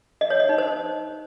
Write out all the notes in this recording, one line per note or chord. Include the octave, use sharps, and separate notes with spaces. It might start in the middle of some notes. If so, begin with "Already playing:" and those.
D#5
C#5
D#5
D#4
C5